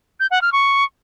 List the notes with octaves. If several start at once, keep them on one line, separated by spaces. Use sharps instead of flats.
G6
F#5
F6
C#6